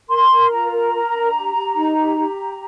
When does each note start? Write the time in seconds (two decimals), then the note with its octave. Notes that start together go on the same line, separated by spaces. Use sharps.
0.08 A#4 C6
0.29 A#4
0.50 F4 A#5
0.70 A#4
0.92 A#4
1.13 D4
1.33 G4
1.54 G4
1.74 D#4
1.96 G4
2.16 G4